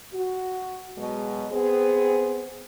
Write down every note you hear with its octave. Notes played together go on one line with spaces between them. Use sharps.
F#4
B2 F#3 G#3
B3 C4 G#4